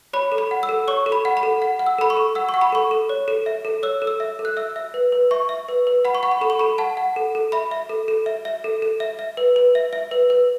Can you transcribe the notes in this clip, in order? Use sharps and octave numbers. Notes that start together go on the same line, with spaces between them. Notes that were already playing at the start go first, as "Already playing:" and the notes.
C#5 B5
A4
B5
F#5
E6
A4
C#5 C#6
A4
B5
F#5
B5
A4
F#5
F#5
E6
A4 B5
C#6
A4
F#5 E6
C#6
F#5
B5
A4 C#6
A4
C#5
A4
E5
A4
C#5 E6
A4
E6
E5
A4
F#6
E5 E6
E5
B4
B4
E5 C#6
E5
B4
B4
F#5 B5
C#6
F#5 B5
C#6
A4 B5
C#6
A4 B5
F#5 A5
F#5
A4
A4
E5 B5
E5
A4
A4
E5
E5
A4
A4
E5
E5
B4
B4
E5
E5
B4
B4